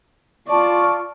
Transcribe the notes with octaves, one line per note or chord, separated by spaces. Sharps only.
F4 D5 A5 C#6